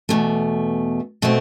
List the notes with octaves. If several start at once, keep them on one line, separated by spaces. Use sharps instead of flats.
E2 B2 A3
B2 A3 C4